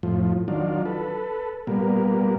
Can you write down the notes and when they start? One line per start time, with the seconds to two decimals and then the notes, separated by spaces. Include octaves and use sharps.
0.03 F2 A2 F3
0.48 D#3 F#3 D4 F4
0.85 A4 B4
1.67 A#2 G3 A#3 B3